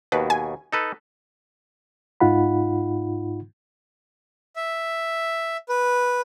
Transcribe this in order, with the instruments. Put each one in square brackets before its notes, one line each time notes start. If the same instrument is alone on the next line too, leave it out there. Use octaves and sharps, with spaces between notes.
[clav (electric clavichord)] D#2 B2 [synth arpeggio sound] B4
[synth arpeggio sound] G#5
[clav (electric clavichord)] D#4 A4 B4
[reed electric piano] G#2 D#4 F4 F#5 B5
[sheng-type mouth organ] E5
B4